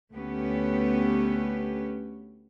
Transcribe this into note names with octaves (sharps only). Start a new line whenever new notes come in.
D2 A3 B3 C#4 G4 B4